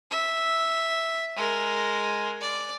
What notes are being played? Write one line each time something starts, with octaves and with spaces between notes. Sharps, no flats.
E5
G#3 A#4
D5